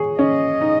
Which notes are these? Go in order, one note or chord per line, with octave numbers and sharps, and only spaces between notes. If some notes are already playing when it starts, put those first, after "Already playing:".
Already playing: G#4 C#5
C#4 D#5
D#4